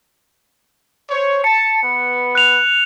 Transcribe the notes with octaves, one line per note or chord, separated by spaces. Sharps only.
C5 C#5
A5 C#7
B3 B4
F#6 F7